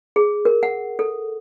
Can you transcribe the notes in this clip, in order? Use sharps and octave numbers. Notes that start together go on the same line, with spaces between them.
G#4
A#4
F#5
A4